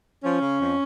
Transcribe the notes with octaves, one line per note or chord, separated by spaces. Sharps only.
F3 C#4
C#3
F2